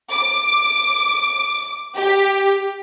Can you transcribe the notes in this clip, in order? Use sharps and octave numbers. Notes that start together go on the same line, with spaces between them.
D6
G4